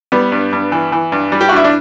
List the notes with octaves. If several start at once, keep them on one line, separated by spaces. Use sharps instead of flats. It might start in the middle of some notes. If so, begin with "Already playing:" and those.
G3 B3
G2
G2
E3
E3
G2
G3
G4
F#4
G2 E4
D4